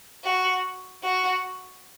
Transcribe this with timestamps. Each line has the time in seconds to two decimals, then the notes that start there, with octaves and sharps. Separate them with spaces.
0.24 F#4
1.03 F#4